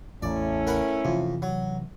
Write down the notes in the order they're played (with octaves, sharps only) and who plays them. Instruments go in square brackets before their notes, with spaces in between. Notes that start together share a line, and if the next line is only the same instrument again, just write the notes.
[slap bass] A1 E2 [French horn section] A3 C#4 E4 [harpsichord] D5
[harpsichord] A#4 F#5 B5
[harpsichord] F2 [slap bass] C3 E3
[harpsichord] F#3